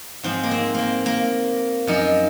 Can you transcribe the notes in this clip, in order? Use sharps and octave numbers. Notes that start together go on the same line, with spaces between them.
G#2 F3 C4
A#3
C4
A#3 C4
A#3
F#2 F3 D#4